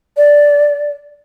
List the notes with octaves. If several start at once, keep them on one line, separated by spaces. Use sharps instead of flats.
D5